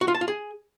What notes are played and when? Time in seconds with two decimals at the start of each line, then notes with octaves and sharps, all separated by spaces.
0.01 F#4
0.08 F4
0.14 A5
0.21 F4
0.28 G#4